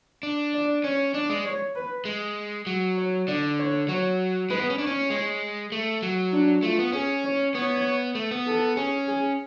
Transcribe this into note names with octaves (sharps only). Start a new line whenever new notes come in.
D4
D5
C#4 C#5
D4 D5
G#3
C#5
B4
G#3
F#3
C#5
D3 D5
C#5
F#3 C#5
G#3 B4
B3
C#4
D4 C#5
C#4
G#3
A3
F#3
D4
A3 F4
B3
C#4 G#4
C#5
B3 C#5
A3
B3
A4
C#4 G#4
G#4